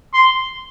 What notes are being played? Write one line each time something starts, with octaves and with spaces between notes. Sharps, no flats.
C6